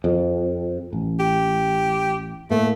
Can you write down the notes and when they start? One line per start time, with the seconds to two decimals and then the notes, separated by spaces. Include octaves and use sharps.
0.04 F2
0.93 A1
1.19 G4
2.50 A2 A3 A#3